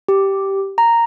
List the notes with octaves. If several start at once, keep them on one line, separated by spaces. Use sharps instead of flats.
G4
A#5